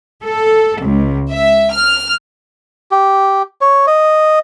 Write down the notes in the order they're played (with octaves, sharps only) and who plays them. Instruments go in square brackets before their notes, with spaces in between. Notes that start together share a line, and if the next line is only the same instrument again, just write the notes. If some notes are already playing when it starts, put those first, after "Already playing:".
[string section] A4
C#2
E5
F6
[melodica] G4
C#5
D#5